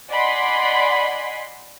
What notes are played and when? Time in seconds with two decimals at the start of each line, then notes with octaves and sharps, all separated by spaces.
0.10 D5 D#5 F#5 G#5 B5 C6